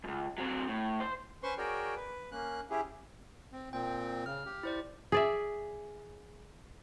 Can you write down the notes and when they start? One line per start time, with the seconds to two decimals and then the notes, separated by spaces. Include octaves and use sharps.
0.04 C#2 F#2
0.38 F#3 C4
0.68 A2
1.00 C5
1.43 C#4 B4 C5 C6 C#6
1.58 F#4 G#4 A#4 C#5 D5 G5
1.96 B4
2.32 A#3 C#4 F#6
2.70 C#4 E4 G4 G#4
3.52 C4
3.73 A#2 C4 G5
4.26 C#3 F6
4.46 G4
4.63 E4 C5 D5
5.12 G#4 D5 E5